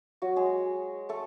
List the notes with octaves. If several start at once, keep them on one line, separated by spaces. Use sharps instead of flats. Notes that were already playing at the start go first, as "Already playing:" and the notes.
F#3 F#4
G#3 G#4
A3 A4